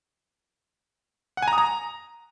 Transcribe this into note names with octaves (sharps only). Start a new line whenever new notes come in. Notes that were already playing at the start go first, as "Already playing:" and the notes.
F#5
G#5
A#5
D#6
A#5